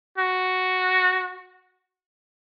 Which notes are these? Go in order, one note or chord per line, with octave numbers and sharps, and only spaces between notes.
F#4